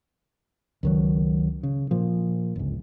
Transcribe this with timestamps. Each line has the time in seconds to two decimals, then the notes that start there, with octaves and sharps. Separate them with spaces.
0.83 C#2 D#3 F#3
1.63 C#3
1.91 A#2 F3
2.56 G1 C#2